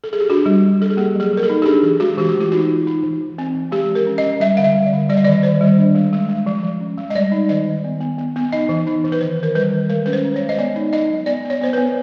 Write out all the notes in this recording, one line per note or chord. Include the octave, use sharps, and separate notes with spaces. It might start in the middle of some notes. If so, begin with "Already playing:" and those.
A4
G#4
G4
D4 F#4
G3
G3
G3 A4
G#4
A#3 G4
F#3 G#4
F#3 A#4
A4
D#4
G4
D4 G#4
E3 G#4
G#3 F#4
E3 G4
F#4
A3
F4
D#4 F#4
D#4
D#4
E3
E3
C4
E3
G#3 G4
F3
A#4
C#4
D#5
C#4
G3 E5
D3 F5
E5
G3
D5
D3
G3 D5
D#5
D#3 D5
D#3 C5
G3
D4
G#3
G#3
G#3
F3
F3
C#4
G#3
D#5
G3 D5
D#4
D#3 D#5
D#3
B3
B3
B3
B3
D#4 D#5
E3
D#4
E3
B4
D#3 C5
D#3 A#4
G3 B4
D#3
G#3 A#4
C#4 B4
C5
C#4
G#3 C#5
D#5
B3 D5
D#4
D#4 D#5
F#3
B3 D5
B3
C#5
B3 C5
B3 B4